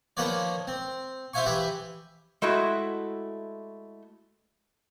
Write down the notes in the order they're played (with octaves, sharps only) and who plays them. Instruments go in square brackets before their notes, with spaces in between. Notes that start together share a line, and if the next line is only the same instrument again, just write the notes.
[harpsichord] D#3 F3 A#3 B4 C#5 D5
C4
F4 C5 E5 F5 G#5 C#6
E3 G4 B4 E5
[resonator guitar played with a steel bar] G#3 A3 E4 F#4